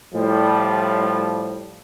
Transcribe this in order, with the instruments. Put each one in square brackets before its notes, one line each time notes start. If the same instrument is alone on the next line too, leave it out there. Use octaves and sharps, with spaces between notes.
[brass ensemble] A2 F3 G3